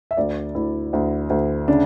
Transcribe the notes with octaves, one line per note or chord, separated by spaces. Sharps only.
E5
D2 D5
D2 E4
D2
D2
C#3 D4